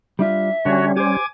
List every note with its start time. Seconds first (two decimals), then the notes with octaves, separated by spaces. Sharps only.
0.19 G3 D4 F4 E5
0.65 D3 G3 C#4 F#4 C#5
0.96 G4 C5 G#5 D6 G#6